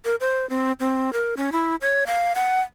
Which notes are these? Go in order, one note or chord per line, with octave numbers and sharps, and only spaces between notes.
A#4
C5
C4
C4
A#4
C#4
E4
C#5
F5
F#5